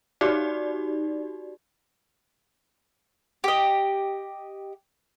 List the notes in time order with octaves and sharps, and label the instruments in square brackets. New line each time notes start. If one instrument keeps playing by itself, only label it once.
[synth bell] D#4 F#4 G4 D5
[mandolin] G4 D#5